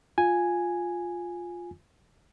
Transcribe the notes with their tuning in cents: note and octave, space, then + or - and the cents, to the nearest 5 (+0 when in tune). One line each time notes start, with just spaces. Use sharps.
F4 +5 G#5 +0